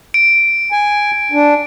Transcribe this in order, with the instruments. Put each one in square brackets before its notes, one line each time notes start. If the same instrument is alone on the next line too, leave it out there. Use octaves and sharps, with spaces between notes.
[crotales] D7
[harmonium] G#5
D4